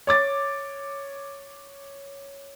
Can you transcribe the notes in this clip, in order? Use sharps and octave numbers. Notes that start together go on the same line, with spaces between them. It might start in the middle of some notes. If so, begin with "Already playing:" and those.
C#5 D6 A6